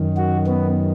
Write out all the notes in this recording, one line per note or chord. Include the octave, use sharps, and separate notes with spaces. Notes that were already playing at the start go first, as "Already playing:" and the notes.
Already playing: F#2 D#3
F#4
B3